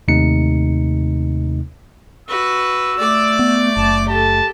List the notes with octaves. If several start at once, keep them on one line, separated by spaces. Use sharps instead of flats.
D#2 C3 A3 D#4 C#7
F#4 B4 E6
A3 D5 D6
B3
F#1 A5
G4 A4 A5